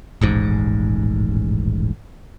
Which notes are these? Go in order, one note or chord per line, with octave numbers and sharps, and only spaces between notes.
D#1 A1 G#2